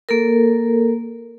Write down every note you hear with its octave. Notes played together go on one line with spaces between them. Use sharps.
A#3 A4 A#4